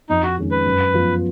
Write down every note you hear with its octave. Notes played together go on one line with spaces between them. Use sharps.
F2 D#4
F#4
D#3 G#3 C#4
B4
F#2
F3 B3 F4